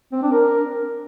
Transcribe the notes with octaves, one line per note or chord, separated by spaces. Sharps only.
C4
D4
A#4